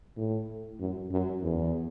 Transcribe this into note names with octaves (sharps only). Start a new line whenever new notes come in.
A2
F#2
F#2
E2